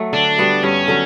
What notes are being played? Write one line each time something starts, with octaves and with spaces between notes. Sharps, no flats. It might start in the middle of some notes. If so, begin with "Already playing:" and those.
Already playing: F#3 A3 F#4
D3 D4
G3 B3 F#4
G2 C#4
D3 F#3